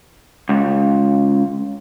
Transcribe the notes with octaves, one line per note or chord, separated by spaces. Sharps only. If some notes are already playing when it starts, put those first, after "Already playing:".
C#2